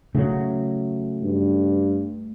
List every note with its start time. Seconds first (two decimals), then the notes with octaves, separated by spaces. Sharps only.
0.15 C#3 F#3 A3
1.23 G2